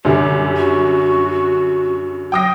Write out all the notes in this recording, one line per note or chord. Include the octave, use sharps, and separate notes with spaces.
F#2 D3 G3 G4
F#4
F#3 G5 D#6 A#6